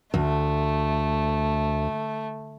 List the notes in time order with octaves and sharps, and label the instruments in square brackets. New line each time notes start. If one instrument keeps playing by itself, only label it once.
[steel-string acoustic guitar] D2 [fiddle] A3